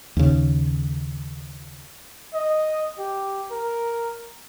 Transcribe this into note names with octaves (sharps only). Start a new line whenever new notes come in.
D#2 C#3
D#5
G4
A#4